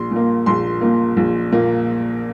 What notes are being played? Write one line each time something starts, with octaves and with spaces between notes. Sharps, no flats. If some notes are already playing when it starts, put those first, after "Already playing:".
Already playing: A#1 C6
A#2 A#3
A#1 C6
A#2 A#3
A#1
A#2 A#3